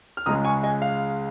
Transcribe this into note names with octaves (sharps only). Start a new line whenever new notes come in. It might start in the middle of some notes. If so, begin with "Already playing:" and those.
F6
C#2 C#3 G#3 A#5 D#6
G#5 C#6
D#5 G#5
F5